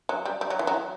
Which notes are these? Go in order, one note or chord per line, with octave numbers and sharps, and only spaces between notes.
F#3
G3
G3
F#3
E3
F#3